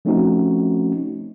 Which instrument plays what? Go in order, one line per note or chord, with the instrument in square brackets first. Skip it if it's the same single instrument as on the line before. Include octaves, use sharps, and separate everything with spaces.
[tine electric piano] F3 A3 C4 C#4 D#4 F#4